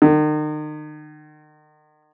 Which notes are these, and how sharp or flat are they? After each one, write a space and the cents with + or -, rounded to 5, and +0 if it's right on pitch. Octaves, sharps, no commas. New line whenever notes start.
D#3 -40